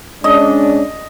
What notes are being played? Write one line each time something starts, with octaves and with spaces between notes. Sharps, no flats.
G#3 C#4 D4 D#5